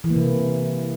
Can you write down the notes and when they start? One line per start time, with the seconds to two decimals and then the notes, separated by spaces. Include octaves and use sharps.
0.04 E3
0.10 A#3
0.16 C3